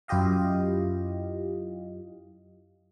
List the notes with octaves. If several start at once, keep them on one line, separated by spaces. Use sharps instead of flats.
F#2 E4 F4 G4 D#5 F5